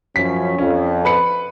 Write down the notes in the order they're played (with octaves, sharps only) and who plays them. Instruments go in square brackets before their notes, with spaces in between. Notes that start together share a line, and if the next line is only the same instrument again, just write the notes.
[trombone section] F#2 F3 C#4 [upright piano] B6
[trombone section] F2 [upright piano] C#4
[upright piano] B4 B5 C#7